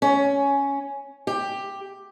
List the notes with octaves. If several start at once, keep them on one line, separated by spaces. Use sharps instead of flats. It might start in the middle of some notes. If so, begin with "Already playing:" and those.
C#4
G4